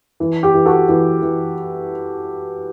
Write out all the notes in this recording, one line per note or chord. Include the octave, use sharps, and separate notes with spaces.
E3
G4
E3
F#4 A4
E3
E3